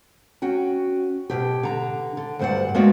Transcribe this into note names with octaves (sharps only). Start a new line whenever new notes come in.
C#4 F#4 G5
B2 G4
D3 A#5
D3
D2 G2 C5 D5 F#5
G#3 A#3 B3 F#4 D5